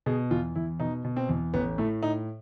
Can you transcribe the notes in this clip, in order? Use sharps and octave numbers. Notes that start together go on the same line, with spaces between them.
B2 G#4
E2 F4
E2 E4
B2 D#4
B2
C4
E2
A1 B3
A2 A3
A2 D#4